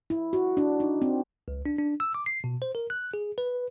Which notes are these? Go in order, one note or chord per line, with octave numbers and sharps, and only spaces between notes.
E4
F#4
D4
D#4
C4
C#2
D4
D4
E6
D6
C7
B2
C5
A#4
F#6
G#4
B4